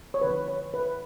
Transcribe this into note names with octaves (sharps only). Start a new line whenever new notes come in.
C#5
D3 F3 B3 B4
C#5
B4